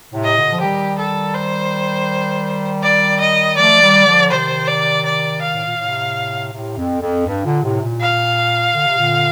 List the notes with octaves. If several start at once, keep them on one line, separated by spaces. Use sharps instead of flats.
A2 C3
D#5
A#2 D3
F3
D#3 G3 G4
A4
C5
D5
D#5
F3 A3 D5
F3
D#3 G3
D3 F3
C3 D#3 C5
D5
D5
F5
A2
A#2
A2 C3
A2 C3
F2
F2
G2
A#2 D3
A2 C3
A#2
F5
D3
C3
A#2 D3